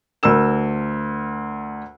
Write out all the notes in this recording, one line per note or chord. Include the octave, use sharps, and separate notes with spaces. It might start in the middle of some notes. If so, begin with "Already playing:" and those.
D2 A#4 E6 E7